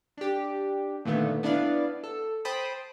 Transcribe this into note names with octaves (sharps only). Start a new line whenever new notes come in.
D4 G4
A#2 D3 D#3 A3 B3
B3 D4 E4 D5 F5
A4
C5 G5 A5 B5 D#6